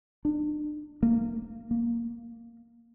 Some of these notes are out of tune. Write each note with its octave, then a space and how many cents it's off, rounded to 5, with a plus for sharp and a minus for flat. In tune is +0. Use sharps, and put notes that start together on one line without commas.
D4 +35
A#3 -20
A#3 +0